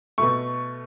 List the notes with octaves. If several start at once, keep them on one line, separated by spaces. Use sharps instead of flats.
B2 A3 C#6